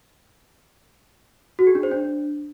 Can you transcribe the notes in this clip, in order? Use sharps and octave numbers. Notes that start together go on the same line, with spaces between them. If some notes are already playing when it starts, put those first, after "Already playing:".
F#4
G#4
D4
C5
D4